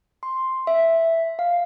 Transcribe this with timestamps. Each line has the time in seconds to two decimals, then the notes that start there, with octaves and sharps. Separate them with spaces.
0.23 C6
0.67 E5
1.39 F5